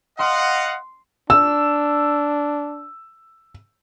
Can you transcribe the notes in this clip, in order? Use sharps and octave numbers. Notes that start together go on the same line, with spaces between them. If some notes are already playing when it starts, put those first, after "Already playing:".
D#5 F5 F#5 C6
D4 E6